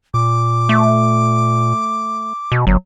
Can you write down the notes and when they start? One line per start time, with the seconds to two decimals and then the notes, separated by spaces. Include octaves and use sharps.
0.14 A#2 D6
0.69 A3
2.52 B2
2.67 G1 F#3